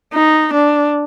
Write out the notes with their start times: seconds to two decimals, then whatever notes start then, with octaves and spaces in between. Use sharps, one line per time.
0.14 D#4
0.53 D4